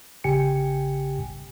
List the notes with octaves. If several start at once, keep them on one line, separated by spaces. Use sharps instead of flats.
A1 C#3 G4 G5 G#5 C#7